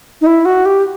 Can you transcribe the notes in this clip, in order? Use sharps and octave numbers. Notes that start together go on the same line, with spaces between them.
D#4
E4
F#4
G4